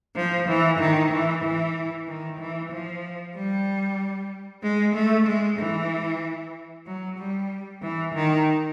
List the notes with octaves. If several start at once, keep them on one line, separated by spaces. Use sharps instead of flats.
F3
E3
D#3
E3
E3
D#3
E3
F3
G3
G#3
A3
G#3
E3
F#3
G3
E3
D#3